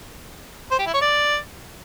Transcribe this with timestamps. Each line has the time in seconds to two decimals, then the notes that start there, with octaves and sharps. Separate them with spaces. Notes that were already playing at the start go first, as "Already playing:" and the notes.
0.71 C5
0.79 G4
0.86 E4
0.94 C#5
1.01 D5